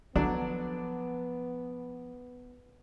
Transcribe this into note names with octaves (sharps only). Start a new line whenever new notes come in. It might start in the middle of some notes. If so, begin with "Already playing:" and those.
D3 F3 F#3 B3 D4